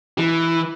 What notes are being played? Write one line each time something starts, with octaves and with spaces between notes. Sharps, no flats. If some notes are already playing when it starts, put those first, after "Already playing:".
E3